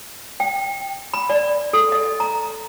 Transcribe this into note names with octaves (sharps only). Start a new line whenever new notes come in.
G5
B5
D5
A4
D#5
A#5